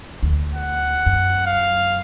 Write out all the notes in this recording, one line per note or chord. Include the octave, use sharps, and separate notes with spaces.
D2
F#5
F#2
F5